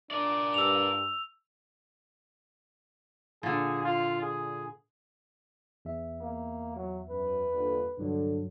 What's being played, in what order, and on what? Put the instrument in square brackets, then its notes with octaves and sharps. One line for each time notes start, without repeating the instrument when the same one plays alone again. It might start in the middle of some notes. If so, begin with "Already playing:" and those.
[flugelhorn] D4 [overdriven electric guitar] A#4 D5
[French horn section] G2 [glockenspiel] E6 F7
[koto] A#2 D3 [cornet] G#4
[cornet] F4
G#4
[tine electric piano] E2 E5
[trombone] A#3
F#3
[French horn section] F#2 [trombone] B4
[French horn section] G2 A#2 D3
[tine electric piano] C2 G2 F#3 [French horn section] D3